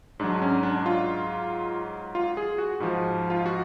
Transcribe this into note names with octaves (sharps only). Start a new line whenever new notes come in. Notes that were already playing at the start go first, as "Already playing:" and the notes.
G#2 F#3 D4
C#4
D4
F4
F4
G#4
F#4
G#2 F3 F#4
F4
F#4